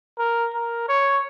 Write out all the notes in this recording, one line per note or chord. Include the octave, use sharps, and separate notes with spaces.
A#4
A#4
C#5